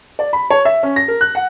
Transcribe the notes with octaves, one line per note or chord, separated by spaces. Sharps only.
D5
B5
C#5
E5
C#4
A#6
A#4
F#6
F#5